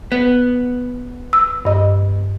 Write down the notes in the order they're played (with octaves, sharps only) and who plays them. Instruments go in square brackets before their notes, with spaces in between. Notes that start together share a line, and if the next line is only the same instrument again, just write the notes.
[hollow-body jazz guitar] B3
[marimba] E6
G2 D#5